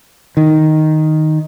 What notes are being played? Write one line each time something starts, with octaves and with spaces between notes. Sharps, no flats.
D#3